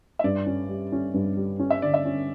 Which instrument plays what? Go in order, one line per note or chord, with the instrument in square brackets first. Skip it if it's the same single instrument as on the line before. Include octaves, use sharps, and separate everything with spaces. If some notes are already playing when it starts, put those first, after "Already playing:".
[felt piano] E5
[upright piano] G2 [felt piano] D5
[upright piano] C#4
G3
C#4
G2
G3
C#4
[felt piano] E5
[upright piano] D3 [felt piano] D5
[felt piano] E5
[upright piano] C#4